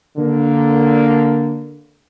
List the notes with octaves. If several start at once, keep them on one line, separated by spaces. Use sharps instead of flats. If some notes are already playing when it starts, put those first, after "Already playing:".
D3 A#3